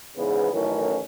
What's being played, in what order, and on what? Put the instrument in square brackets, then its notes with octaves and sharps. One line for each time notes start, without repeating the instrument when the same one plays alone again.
[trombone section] E2 G#2 C#3 B3
A1 F#2 A2 D#3 C#4